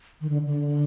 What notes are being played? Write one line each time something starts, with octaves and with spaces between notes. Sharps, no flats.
D#3
D3
D3